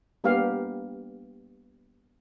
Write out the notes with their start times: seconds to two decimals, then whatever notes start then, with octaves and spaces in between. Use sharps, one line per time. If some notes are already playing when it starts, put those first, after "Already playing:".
0.24 G3 A#3 B3 D4 G4 F5